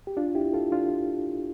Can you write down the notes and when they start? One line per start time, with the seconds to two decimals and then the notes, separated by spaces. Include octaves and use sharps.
0.07 G4
0.17 D4 F4
0.35 E4 G4
0.53 F4 A4
0.72 D4 F4